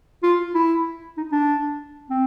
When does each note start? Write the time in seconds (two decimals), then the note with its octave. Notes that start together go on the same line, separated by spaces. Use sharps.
0.23 F4
0.55 E4
1.17 D#4
1.32 D4
2.10 C4